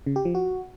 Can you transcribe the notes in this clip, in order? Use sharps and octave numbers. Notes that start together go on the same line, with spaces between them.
C#3
G4
F3
F#4